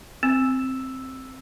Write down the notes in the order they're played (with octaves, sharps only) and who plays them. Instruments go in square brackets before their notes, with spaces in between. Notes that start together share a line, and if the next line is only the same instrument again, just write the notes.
[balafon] C4 [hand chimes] E6